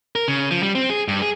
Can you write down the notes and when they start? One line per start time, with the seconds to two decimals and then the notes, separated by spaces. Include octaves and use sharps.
0.16 A#4
0.28 C#3
0.51 F3
0.63 G3
0.75 C4
0.90 G#4
1.08 G2
1.22 G#4